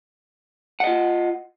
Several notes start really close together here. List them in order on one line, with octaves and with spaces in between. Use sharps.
F#5 D#5 F4